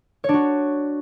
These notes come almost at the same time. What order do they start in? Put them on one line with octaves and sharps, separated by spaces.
C#5 D4 F#4